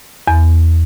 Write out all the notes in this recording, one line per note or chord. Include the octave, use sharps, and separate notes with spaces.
E2